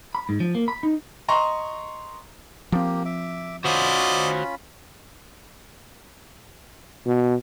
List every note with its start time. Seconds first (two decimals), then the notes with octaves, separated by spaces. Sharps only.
0.15 B5
0.29 G#2
0.40 F3
0.55 A#3
0.68 B5
0.83 D#4
1.28 D#5 A#5 C6 C#6
2.72 F3 A#3 C4 G4
3.05 E5 D6
3.65 C#4 F4 F#4 C5 D5 D#5 B5
7.06 B2